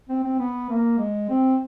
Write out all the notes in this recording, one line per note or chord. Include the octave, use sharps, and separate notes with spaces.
C4
C4
B3
A#3
G#3
C4